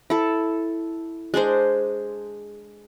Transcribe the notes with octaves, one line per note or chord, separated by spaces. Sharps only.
E4 A4
G#3 D4 G#4 C5